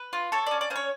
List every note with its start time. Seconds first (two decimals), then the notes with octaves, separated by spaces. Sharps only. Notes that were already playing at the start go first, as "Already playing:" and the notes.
Already playing: B4
0.13 F4
0.32 A4 C#5
0.47 C#4 D5
0.61 D5
0.70 C#4 C5
0.76 C#5